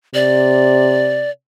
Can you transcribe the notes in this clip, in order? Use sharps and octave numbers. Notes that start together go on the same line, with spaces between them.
C3 D5